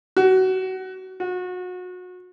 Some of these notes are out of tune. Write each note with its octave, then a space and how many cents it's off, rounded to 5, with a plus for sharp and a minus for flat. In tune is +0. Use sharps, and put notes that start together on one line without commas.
F#4 +25
F#4 -30